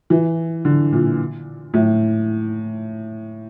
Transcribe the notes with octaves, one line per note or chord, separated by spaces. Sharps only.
E3
D3
A#2
A2